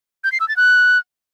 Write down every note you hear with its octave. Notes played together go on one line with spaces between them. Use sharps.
G6
C7
E6
A6
F#6